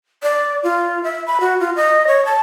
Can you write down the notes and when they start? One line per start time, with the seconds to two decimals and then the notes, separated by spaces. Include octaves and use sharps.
0.23 D5
0.63 F4
1.04 E5
1.27 B5
1.40 F#4
1.60 F4
1.76 D#5
2.07 C#5
2.25 A5